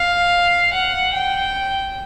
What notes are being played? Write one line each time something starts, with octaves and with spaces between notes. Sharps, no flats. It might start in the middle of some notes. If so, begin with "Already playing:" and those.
Already playing: F5
F#5
G5